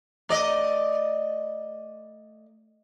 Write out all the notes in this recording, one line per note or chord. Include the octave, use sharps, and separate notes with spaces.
A3 D5 D#5